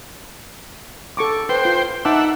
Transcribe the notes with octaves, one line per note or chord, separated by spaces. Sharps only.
A4 C#6 D6
B4 C5 G5
F4
D#4 E5 F#5 A5 D6